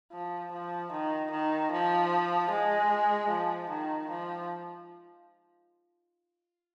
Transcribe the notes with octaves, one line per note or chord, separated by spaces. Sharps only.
F3
F3
D#3
D#3
F3
G#3
F3
D#3
F3